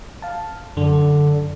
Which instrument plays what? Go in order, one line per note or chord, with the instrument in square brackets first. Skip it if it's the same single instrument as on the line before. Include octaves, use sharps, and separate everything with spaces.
[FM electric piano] F5 A5
[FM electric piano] F#2 D4 [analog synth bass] D3